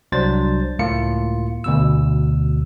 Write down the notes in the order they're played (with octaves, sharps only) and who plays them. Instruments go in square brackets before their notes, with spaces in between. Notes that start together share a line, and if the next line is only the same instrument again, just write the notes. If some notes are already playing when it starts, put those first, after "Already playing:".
[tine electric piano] C2 F#3 D4 C5 A6
C#2 A2 A#3 F4 C#7
D2 B2 E6